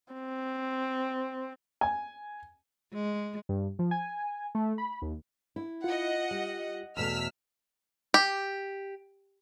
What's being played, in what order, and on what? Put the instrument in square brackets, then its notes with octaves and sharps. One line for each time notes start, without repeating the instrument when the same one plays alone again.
[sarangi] C4
[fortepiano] G#5
[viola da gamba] G#3
[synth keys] G2
F3
G#5
A3
B5
D#2
[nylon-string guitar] E4
[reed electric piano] F4 [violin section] D#5 F#5
[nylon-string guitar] G3
[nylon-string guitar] E2 B2 A3 [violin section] E6 F6 B6
[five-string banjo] G4